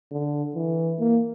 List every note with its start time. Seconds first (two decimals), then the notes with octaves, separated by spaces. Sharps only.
0.11 D3
0.55 E3
1.00 A#3